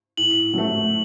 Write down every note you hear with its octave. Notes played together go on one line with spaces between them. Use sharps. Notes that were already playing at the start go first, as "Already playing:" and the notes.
A2 F#7
F#3 A3